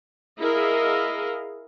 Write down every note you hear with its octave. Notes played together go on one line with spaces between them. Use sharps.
E4 G#4 A#4 D#5 F5